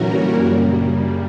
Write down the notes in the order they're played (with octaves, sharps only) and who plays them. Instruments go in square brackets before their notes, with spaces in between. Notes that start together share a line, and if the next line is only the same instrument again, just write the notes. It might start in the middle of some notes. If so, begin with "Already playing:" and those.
Already playing: [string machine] A#2 G3 C#4 F#4 A#4 [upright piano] D3 E3 F#3
[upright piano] F#3
[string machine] F#2 C#3 G3 [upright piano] A#3